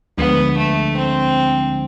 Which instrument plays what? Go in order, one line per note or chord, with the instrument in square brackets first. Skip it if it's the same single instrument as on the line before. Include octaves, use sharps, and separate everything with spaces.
[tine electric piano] D2 D3 F3 G#3 D4 [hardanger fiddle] B3
[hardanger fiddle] A3
C4